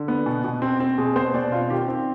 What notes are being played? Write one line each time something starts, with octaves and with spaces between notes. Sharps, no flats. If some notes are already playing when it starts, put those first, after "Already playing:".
Already playing: D3
B3
B2
B2
C4
C4
B2 G#4
B2 C5
B2 D5
C4 F4
D#3 G4
C4